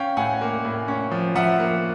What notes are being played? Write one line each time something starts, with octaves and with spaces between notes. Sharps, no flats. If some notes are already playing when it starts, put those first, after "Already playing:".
Already playing: C#4 F5 G5
A2 F#5 G#5
A#3
A2
C#4
F3
F3 E5 F#5
A#3